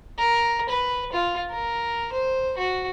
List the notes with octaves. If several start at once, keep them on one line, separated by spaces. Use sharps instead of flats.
A#4
B4
F4
A#4
C5
F#4